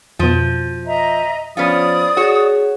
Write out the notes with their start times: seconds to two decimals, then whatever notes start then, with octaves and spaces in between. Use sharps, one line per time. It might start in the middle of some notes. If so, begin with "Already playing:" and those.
0.19 F2 B2 F3
0.86 D#5 E5 A#5
1.57 F3 B3 C#4 F4 D5 D#6
2.17 F#4 G#4 C#5